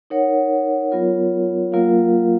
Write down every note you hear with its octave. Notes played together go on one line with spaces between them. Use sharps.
D#4 A#4 C#5 F#5
F#3 B3 F4 A#4 C#5
F#3 A#3 F4 A#4 F5